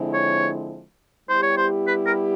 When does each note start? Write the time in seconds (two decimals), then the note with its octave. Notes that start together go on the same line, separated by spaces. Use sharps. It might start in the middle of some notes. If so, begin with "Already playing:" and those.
Already playing: D3 F3 G#3 C4 E4
0.13 C#5
1.29 G3 B3 E4 G4 C5
1.42 C#5
1.57 C5
1.87 B4
2.06 A#4